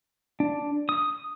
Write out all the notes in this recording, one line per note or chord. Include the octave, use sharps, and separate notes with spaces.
D4
D#6